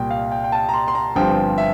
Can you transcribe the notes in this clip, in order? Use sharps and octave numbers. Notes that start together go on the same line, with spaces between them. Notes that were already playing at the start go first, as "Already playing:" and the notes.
Already playing: C2 A#2 G3 A#3 G5
F5
G5
G5
A5
A#5
C6
C6
A#5
G1 G2 F3 C4 G5
E5